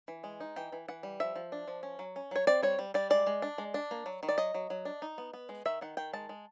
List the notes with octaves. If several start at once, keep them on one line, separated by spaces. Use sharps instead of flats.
E3
G#3
D#4
E3 G5
E3
E3 F#5
G3
F3 E5
F3
D4
F3
C#4
F#3
C#4
F#3 C#5
C4 D5
G3 C#5
G3
G3 D5
G#3 D5
G#3
D4
G#3
D4
A#3
F#3
D#3
D5
F#3 D#5
F#3
F#3
D4
D#4
B3
B3
G#3
D#3 E5
D#3 F#5
D#3 G5
G#3 A5
G#3